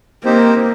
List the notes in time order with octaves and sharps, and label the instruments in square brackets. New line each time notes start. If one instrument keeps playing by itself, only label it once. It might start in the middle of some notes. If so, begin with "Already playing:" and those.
[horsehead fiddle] A#3 [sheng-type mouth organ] C4 D#4 G4 C5